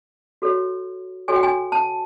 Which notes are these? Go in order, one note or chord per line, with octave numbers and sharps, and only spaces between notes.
F#4 A4 C#5
F#4 A4 C#5 G#5
G5
G#5
A5